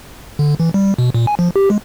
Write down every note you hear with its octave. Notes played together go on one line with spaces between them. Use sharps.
D3
E3
G3
B2
A#2
G#5
F3
G4
G#3